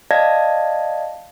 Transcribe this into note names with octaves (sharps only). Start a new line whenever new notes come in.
D5 D#5 F5 A5 G#6 A#6